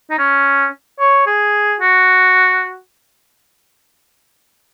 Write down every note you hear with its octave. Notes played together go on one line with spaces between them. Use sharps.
D#4
C#4
C#5
G#4
F#4